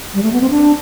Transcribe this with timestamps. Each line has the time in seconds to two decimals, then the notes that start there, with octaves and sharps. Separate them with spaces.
0.14 G3
0.23 A3
0.33 B3
0.41 C4
0.50 D4